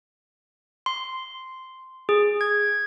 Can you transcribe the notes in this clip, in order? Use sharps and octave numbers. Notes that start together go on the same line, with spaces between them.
C6
G#4
G#6